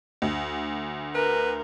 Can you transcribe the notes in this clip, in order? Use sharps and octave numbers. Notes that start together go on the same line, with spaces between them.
D2
A#4 B4